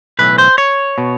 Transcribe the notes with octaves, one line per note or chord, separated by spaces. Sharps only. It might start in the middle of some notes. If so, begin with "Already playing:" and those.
B1 A2 E3 B4
C5
C#5
B2